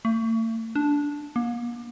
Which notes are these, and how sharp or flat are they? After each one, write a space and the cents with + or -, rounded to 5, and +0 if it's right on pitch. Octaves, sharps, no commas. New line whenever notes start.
A3 +40
D4 -10
A#3 +40